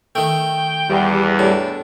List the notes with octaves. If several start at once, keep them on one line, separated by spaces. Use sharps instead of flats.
D#3 A3 G5
E2 G3
A2 D4